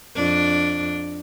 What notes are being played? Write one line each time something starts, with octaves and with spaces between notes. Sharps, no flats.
F2 D4